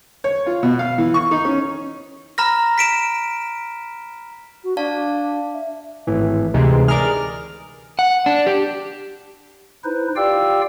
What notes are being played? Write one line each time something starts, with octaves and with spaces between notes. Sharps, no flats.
C#5
F4
B2
F5
E3
C#6
D#4
C#4
A#5 B5 F6 A#6
B6 D7 E7
F#4
D4 D5 F5 A5
E5
G#1 A2 E3
D2 C3 E3 G#3 D#4
G#4 A#4 D5 F6
F#5
D4
G4
D#4 E4 B4 C5
F4 G4 D5 F5 G5 E6